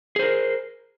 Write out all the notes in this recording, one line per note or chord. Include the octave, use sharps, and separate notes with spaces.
G#4 A#4 C5